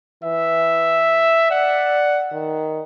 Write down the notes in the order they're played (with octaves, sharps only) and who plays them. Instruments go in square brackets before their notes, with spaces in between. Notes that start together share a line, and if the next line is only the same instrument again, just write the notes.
[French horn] E3 [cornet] E5
[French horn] D5 [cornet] F#5
[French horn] D#3